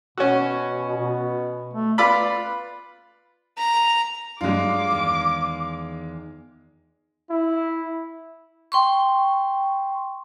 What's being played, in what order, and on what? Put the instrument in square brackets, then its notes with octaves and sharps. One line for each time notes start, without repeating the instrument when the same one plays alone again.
[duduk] B2 [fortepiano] C#4 F#4
[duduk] B2
A3
[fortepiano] F4 D5 B5 [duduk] B4
[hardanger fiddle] A#5
[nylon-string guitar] G2 F#3 [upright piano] G#3 F4 [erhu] D6
[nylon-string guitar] E2 D#3
[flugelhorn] E4
[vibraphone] G5 C6 C#6